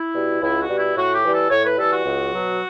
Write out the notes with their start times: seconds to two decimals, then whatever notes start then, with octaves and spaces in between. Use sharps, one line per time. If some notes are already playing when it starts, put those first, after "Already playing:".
Already playing: E4
0.15 B2 G3
0.42 C#2 E4
0.60 F#4
0.69 B2 G3
0.78 E4
0.96 A2 F#4
1.15 G4
1.24 E3 G3
1.33 A4
1.51 A2 C#5
1.65 B4
1.78 E3 G3 A4
1.92 F#4
2.05 C#2
2.33 B2 F#3